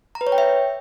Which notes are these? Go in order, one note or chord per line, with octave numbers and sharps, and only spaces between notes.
A#5
B4
C#5
G5
E5